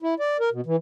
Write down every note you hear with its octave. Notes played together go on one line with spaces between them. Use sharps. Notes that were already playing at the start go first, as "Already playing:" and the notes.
E4
D5
A#4
B2
E3